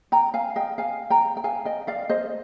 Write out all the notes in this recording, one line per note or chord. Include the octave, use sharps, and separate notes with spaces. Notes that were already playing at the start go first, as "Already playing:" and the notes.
G5 A#5
F5 G#5
D#5 G5
F5 G#5
G5 A#5
G5
F5 G#5
D#5 G5
D5 F5
C5 D#5